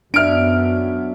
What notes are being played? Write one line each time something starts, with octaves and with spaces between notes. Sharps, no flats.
F#2 F#3 B3 D4 E5 F6 D7